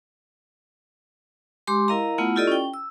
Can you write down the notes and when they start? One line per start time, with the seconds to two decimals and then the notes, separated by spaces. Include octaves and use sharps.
1.67 G#3 G4 C6 D6
1.88 E4 A#4 D#5 F5 A#5
2.18 A3 B3 E4 F4 F#5
2.36 E4 F4 G4 A4 D5 D#5
2.47 C#4 G5
2.74 E6